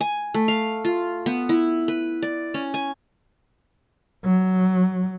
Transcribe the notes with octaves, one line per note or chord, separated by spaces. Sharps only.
G#5
A3
F5
F4
B3
E4
B4
D5
C#4
G#5
F#3